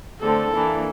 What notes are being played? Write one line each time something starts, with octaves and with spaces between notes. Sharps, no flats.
D3 A3 C4 A4
E3 A#3 D4